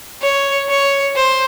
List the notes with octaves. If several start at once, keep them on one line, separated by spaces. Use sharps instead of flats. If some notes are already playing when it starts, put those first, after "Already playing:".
C#5
C#5
C5